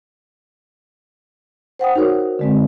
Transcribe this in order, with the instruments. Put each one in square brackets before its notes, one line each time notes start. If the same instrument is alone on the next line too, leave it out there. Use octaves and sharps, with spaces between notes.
[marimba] C5 F#5 G5 D#6
D#4 F#4 A#4 C#5
D3 G#3 C4